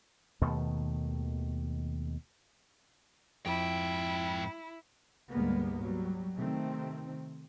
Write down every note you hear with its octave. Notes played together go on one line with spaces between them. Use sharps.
D#2 B2 D#3 A3
F2 G#2 E4 G5
D2 G#2 G3 G#3 A#3 B3
F#3 G3
C3 D#3 A3 C4